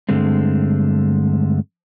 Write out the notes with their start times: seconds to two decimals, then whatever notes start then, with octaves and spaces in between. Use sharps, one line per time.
0.09 G2 D3 G#3 A3 C4